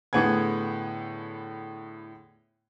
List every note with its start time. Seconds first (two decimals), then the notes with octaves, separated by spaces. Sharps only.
0.13 A2 D3 B3 G#4 G#6